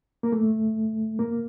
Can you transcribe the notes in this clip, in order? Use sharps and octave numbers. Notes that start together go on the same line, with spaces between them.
A#3
A3
A#3